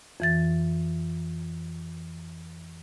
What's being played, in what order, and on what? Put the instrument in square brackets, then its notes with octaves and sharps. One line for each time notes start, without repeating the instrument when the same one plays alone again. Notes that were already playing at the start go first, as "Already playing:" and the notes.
[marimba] F2 E3 A6